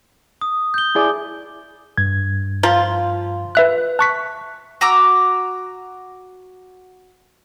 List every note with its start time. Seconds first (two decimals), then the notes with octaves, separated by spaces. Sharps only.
0.41 D#6
0.74 G6 G7
0.95 E4 G#4 D5
1.98 G2 G#6
2.63 F3 F4 A#5
3.55 B4 E5 F#6
3.99 A5 C#6 F#6 B6
4.81 F#4 A#5 D6 E6